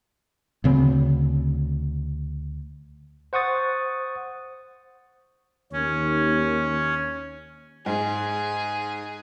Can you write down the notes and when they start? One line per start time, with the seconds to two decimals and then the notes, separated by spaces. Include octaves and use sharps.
0.64 D2 C#3 C4
3.33 C5 F#5 C#6 D#6 A6
5.72 D#2 C#4
7.86 G#2 G#4